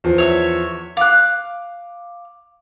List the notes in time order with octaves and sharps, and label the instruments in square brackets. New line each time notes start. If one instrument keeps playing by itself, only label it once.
[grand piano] E2 F3
[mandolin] C#5 E5
[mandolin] F5 F#6 [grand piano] D6